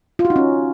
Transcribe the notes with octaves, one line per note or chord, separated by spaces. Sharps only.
F4
F#4
D#4
C#4